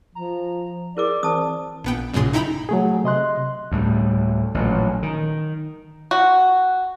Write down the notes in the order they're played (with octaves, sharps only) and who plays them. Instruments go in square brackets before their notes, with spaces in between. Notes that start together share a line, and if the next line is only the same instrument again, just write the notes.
[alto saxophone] F3 [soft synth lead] A#5
[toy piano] E4 A#4 D6 [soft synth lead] G#4 [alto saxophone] D5
[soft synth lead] E3 [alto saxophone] C4 [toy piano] A5 D#6
[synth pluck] A#1 B3 G5
A1 F#2 A#2 C#3 G#4 C6
D#4 E4 G5 A#5 B5
[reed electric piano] F#3 A3 G#4
C3 D#5 C6 F#6
[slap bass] D2 A2 G3
A1 A#2 D3 F#3
D#3
[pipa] F#4